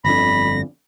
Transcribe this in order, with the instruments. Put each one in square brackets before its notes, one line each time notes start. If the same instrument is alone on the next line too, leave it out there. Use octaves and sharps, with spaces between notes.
[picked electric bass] G1 F2 D3 [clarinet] B5 [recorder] A#6